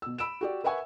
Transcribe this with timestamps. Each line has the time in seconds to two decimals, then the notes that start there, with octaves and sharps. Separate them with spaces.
0.02 B2 E6
0.18 B5 E6 D7 E7
0.41 F#4 G4 D5
0.64 A#4 B4 E5 F#5 G#5 C#6